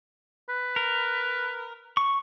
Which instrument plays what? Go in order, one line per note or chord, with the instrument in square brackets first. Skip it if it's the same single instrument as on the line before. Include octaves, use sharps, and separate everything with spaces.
[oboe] B4
[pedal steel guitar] A#4
C#6